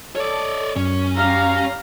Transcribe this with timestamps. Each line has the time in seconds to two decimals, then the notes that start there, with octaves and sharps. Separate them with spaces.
0.16 A4 C#5 D5
0.76 F#2 C#4
1.15 G3 F5 A#5